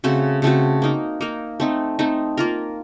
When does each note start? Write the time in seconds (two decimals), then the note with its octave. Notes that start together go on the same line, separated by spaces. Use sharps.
0.04 C#3 A3 C4 F#4
0.42 C#3 A3 C4 F#4
0.82 A#3 D#4 A#4
1.21 A#3 D#4 A#4
1.60 A3 C4 D#4
1.99 A3 C4 D#4
2.37 A#3 F4 A#4